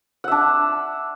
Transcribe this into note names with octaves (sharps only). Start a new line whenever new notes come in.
D4 E5 F#5